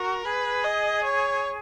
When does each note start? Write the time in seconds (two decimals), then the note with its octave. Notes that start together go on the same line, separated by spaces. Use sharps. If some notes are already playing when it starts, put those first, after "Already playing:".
Already playing: F#4 A#4
0.25 G#4 B4
0.64 D#5
1.04 C#5